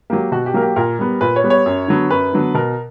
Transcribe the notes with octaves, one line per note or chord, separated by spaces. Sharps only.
F#3 A#3 G4
B2 F#4
G4
F#3 A#3 A#4
G4
A#2 A#4
G3 B3
A#2 B4
C#5
G3 B3
C#5
F#2
D3 F#3 B3
F#2 B4
D3 F#3 B3
B2 A#4